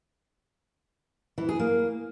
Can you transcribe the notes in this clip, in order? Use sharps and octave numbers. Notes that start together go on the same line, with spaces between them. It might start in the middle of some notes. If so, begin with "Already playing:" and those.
E3
G#4
A#3